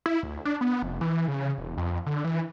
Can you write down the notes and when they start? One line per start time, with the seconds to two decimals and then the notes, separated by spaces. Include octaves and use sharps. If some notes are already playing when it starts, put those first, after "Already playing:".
0.06 E4
0.23 D2
0.45 D4
0.61 B3
0.83 F1
1.01 E3
1.28 C#3
1.58 E1
1.77 F2
2.06 D3
2.24 E3